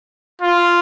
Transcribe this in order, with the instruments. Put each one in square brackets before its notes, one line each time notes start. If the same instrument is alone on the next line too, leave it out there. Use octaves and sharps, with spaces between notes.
[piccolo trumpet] F4